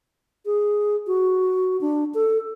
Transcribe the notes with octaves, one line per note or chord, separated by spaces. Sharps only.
G#4
F#4
D4
A4